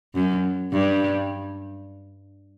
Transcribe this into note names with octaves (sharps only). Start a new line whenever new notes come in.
F#2
G2